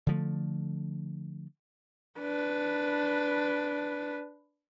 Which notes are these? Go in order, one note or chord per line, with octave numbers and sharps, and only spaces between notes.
D3 F3 A3
D4 B4